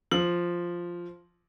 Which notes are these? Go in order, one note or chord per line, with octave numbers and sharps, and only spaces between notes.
F3 F#7